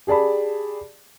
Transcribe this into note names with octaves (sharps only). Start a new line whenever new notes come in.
G4 G#4 D5 A5 B5